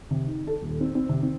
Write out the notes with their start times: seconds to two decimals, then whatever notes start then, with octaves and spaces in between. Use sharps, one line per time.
0.11 C3
0.26 D#3
0.47 A4
0.61 D#1
0.81 C4
0.95 C4
1.09 C3
1.23 C4